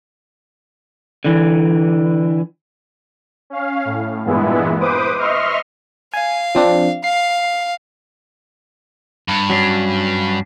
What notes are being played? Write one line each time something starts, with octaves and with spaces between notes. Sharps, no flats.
D3 E3
C#4 F5
A2
G2 A#2 E3 G#3 B3 E4
B4 C5 D6 D#6
D#5 E5 C6 C#6 F6
F5 G#5
F3 C4 D4
F5 C7
G2
F#3 C#4 D4